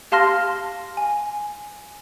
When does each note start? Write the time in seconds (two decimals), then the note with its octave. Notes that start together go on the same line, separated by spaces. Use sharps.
0.12 G4 F5 A5 C6 F6 A#6
0.97 G#5